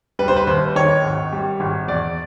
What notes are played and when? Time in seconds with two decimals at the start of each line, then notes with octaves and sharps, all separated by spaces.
0.19 G3 B4
0.28 C5
0.36 B4
0.47 D#2 C5
0.76 D#3 C#5
1.04 G#1
1.32 G3
1.60 G#1
1.88 E2 D5